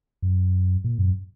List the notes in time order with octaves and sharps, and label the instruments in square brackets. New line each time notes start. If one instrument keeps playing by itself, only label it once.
[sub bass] F#2
A#2
F#2